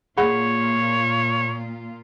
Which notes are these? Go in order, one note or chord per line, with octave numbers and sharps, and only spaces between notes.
A#2 A#3 F4 G#4 C#5 F#5 B5